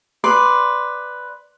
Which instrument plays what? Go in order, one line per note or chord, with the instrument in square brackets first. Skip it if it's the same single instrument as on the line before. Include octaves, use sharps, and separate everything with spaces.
[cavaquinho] B4 D5 C6